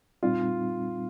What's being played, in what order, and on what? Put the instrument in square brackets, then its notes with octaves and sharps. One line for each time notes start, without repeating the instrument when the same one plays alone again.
[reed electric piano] A#2 G3 C4 D#4 [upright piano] F4